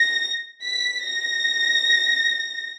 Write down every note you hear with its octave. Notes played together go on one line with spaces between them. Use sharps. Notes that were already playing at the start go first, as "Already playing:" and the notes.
Already playing: A#6
B6
A#6